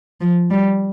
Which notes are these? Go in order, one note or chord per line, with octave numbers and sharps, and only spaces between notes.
F3
G3